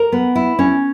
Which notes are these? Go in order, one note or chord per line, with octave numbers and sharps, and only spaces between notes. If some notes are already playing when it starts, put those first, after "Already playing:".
Already playing: A#4
B3
E4
C#4